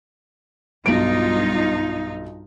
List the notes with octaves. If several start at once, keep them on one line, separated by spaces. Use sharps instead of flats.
B1 G2 D#4 F4 D7